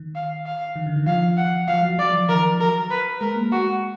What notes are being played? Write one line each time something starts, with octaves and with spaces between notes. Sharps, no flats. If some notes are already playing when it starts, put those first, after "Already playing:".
Already playing: D#3
F5
F5
D#3
D3
D#3
F3 F5
F#5
F3 F5
F#3
F#3 D5
F3
D#3 A#4
F3
F#3 A#4
B4
G#3 A#4
A#3
G#3 F#4